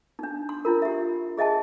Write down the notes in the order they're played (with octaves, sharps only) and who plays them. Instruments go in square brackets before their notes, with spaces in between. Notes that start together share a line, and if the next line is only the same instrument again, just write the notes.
[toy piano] D4 D#4
C6
D4 E4 F4 A#4
G4 E5
G#4 D#5 E5 G#5 A5